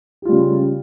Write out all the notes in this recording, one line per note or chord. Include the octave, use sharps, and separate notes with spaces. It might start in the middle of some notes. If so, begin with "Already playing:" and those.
C#3 G3 F4 G4